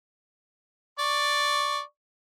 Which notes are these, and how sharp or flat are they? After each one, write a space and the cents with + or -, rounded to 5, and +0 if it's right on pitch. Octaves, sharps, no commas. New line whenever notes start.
D5 +0 C#6 +0